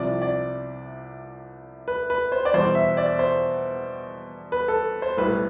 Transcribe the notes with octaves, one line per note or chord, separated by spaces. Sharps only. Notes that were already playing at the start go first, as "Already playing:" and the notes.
Already playing: C2 C3 F3 D5
D5
B4
B4
C5
D5
E2 B2 G3 C5
E5
D5
C5
B4
A4
C5
B1 A2 G3 B4